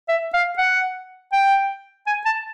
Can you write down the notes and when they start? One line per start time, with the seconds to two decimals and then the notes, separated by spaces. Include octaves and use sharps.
0.09 E5
0.34 F5
0.58 F#5
1.33 G5
2.07 G#5
2.25 A5